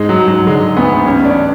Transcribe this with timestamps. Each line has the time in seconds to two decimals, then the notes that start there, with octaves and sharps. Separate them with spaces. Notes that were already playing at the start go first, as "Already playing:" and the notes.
Already playing: G#2 G#3
0.09 F#3
0.19 G#2
0.28 F#3
0.47 D3 G#3
0.77 D2 B3
1.06 A1 C#4
1.25 D4